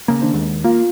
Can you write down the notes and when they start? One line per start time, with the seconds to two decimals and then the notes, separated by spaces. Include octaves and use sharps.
0.08 C#3 A#3
0.21 D#3 D4 C5
0.34 D#2 G#3
0.64 A#3 F4 F5